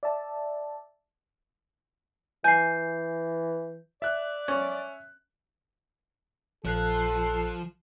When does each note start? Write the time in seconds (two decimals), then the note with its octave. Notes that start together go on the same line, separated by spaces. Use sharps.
0.03 D5 E5 A5
2.44 E3 G#5 G6 C7
4.02 D5 E5 F#6
4.48 C#4
6.65 A#1 F3 A4 F#6 C7